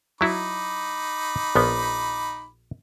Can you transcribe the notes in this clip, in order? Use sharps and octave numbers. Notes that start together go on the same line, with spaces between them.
F#3 D#4 E4 F#4 B5 D6
A#1 F3 B3